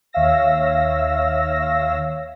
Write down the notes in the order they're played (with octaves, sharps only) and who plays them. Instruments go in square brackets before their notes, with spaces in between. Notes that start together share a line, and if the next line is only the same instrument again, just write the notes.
[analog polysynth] D#2 C#5 E5 F5 E6 A#6